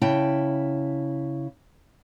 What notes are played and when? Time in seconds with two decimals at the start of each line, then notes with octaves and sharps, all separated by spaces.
0.01 C#3 E4 G5 A5